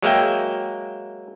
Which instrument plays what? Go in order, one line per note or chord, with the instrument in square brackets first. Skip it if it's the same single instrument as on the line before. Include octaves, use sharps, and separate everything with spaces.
[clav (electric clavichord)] F#3 G#3 A#3 E5 G5